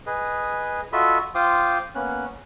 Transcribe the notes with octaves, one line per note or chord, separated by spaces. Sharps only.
G#4 B4 D#5
F4 F#4 A4 D#5 E5 B5
F4 C5 F5 G5 D6 D#6
A#3 B3 C#4 F#6